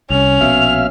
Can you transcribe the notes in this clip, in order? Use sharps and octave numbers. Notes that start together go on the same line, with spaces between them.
C2 C#4 F7
A#1 B2 E5 F5 F6